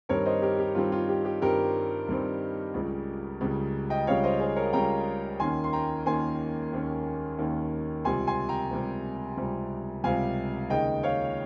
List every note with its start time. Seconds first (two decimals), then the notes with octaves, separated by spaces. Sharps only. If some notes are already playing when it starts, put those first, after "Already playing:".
0.09 G2 D#3 G3 C4 A#4 C#5
0.25 C5 D#5
0.42 G4 A#4
0.59 G4
0.75 G2 D#3 G3 C4 F4
0.92 F4
1.09 G4
1.25 G4
1.42 G2 D#3 G3 C4 G4 A#4
2.08 G2 D#3 G3 C4
2.74 C#2 C#3 G3
3.41 C#2 C#3 G3
3.90 D#5 G5
4.07 C#2 C#3 G3 C#5 F5
4.24 C5 D#5
4.40 G#4 C5
4.56 A#4 C#5
4.73 C#2 C#3 G3 G5 A#5
5.40 D#2 D#3 A#3 C#4 G#5 C6
5.64 C6
5.73 G5 A#5
6.06 D#2 D#3 A#3 C#4 G#5 C6
6.73 D#2 D#3 A#3 C#4
7.38 D#2 D#3 A#3 C#4
8.05 C#2 C3 G3 G#5 C6
8.27 G#5 C6
8.49 G5 A#5
8.71 C#2 C3 G3
9.37 C#2 C3 G3
10.04 C#2 C3 G3 F5 G#5
10.70 D#2 C#3 G#3 D#4 D#5 G5
11.03 C#5 F5